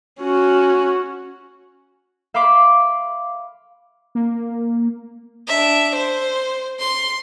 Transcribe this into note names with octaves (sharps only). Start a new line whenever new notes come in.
C#4 F#4
E5 F5 B5 C6 D6
A#3
D4 E5
C5
C6